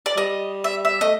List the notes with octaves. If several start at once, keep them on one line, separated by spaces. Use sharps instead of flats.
D5
G3 D#5
E5
E5
A3 D#5